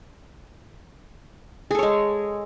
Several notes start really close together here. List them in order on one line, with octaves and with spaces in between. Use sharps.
G#4 A4 C#5 G#3